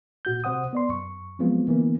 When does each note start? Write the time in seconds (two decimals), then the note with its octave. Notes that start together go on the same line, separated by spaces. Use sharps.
0.25 A#2 F#4 G6
0.44 C3 C5 F#5 D#6
0.73 B3 D5 C6
0.89 F#2 C#6
1.39 F3 F#3 G#3 B3 C4 F4
1.68 D3 E3 A#3 B3